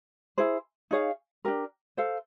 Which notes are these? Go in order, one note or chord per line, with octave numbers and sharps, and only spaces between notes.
E4 G#4 C5
D#4 G#4 C#5 F5
D4 G4 A#4
A4 C5 F5